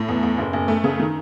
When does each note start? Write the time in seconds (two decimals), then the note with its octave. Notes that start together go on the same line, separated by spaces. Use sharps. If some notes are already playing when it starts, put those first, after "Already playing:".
Already playing: A2
0.08 E2
0.23 E2
0.38 F#1
0.53 F#1
0.68 A3
0.84 C#3
0.99 D#3